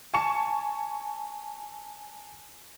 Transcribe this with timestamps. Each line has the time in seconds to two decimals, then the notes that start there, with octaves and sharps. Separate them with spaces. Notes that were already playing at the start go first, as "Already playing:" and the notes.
0.14 G#5 A5 C#6 C#7 E7